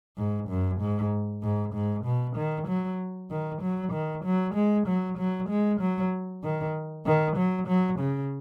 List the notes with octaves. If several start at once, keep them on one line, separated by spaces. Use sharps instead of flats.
G#2
F#2
G#2
G#2
G#2
B2
D#3
F#3
D#3
F#3
D#3
F#3
G#3
F#3
F#3
G#3
F#3
D#3
D#3
F#3
F#3
C#3